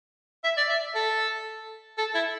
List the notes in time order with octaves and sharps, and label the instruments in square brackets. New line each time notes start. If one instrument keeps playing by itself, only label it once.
[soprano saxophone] E5
D5
E5
A4
A4
E4